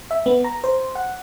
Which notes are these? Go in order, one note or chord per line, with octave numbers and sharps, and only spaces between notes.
E5
B3
A#5
C5
F#5